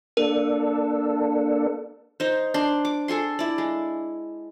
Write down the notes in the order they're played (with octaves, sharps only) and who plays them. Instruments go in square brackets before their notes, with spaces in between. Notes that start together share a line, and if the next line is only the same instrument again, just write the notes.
[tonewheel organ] A#3 D4 A4 [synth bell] A#4
[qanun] D#4 C5
D4 C6
D6
G#4 A4 G#5 C6
E4 D5
G#3